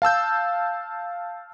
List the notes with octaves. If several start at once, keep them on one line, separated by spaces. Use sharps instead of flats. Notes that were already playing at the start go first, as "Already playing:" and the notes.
F5 A5 E6 G6